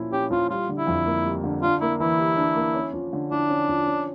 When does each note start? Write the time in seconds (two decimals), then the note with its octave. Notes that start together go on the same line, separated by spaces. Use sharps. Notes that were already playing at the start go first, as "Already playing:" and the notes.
Already playing: A#2 F3 C#4 E4
0.12 C#4 G4
0.31 F3 F4
0.50 G3 F4
0.69 D3
0.78 E4
0.87 F2
1.06 A#3
1.24 G3
1.44 D3
1.62 D4 F4
1.81 A#3 E4
1.99 E3 E4
2.18 G4
2.37 D4
2.55 A#3
2.74 C#4
2.94 F3
3.13 D3
3.31 D4 E4
3.49 C#4
3.69 F3
3.87 C#4